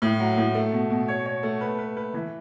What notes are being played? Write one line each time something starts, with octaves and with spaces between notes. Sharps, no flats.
A2
F#3
A2
A3
B2
B2
C#5
C#5
A3
B4
B4
B4
E3